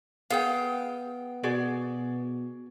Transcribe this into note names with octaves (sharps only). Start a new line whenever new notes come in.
B3 G#4 F5 G5
B2 F#4 G#4 D5